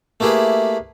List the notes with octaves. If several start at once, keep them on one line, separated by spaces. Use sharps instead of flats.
A3 A#3 E4 G4 G#4 B4